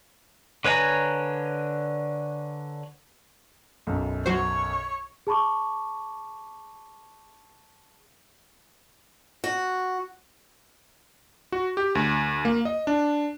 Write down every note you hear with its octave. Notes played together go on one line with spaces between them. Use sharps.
D3 B4 C#5 G#5 A#5
B1 F#2
F#3 F#4 C5 C#5
G#4 A5 B5 C#6 D6
F#4
F#4
G4
D2
A#3
D#5
D4